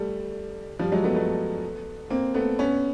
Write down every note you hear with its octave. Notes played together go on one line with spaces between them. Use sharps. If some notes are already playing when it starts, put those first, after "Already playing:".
Already playing: G3 A3
F3 G3
F#3 G#3
A3 B3
A3 B3
A#3 C4
A3 B3
B3 C#4